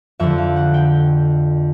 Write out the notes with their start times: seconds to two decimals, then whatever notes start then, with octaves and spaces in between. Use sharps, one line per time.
0.20 F2 D3 E5
0.38 F5
0.56 F#5
0.74 G5